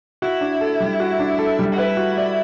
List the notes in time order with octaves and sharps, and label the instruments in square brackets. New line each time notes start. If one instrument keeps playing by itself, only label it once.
[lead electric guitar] E4 [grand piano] F#4
[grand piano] D4
A4
G3
F#4
D4
A4
G3
[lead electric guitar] F#4
[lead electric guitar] E4 [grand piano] B4
[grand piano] F#4
D5